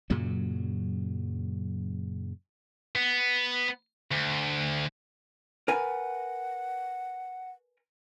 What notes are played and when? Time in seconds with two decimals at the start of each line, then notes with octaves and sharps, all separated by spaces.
0.10 F#2 A#2 C#3 F#3
2.96 B3
4.11 D2
5.68 A#4 B4 F#5 G#5